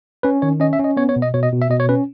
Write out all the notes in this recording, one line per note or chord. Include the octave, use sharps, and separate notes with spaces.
C#4 B4
D#3 C#5
C#4 D#5
E5
C#4
D#5
B3 C#5
C#5
B2
D#5
B2 C#5
D#5
B2
E5
B2 D#5
C#5
C#4 B4